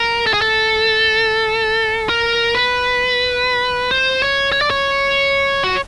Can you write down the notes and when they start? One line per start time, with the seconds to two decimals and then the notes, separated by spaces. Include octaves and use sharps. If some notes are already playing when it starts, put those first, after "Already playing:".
Already playing: A#4
0.26 A4
0.33 G#4
0.41 A4
2.09 A#4
2.55 B4
3.91 C5
4.22 C#5
4.52 C#5
4.61 D5
4.70 C#5
5.64 F#4